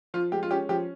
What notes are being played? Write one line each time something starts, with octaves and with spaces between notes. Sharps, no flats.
F3 F4
G#3 G4
F4
C#4 G4
F3 G4